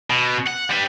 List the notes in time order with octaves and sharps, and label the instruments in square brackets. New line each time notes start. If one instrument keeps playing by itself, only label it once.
[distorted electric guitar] B2
F#5
G3 B4